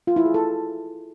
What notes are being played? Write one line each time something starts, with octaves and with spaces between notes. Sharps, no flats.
F4
E4
G#4
A4